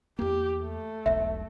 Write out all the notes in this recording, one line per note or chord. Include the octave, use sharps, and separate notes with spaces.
E2 A#3 G4
A3
E1 B1 E5